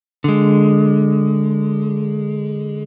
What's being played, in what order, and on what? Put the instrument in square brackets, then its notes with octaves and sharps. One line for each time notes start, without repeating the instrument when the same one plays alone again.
[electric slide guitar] D3 G#3